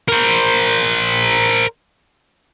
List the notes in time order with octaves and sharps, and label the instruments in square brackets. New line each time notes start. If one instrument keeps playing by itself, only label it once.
[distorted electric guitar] A#4 C5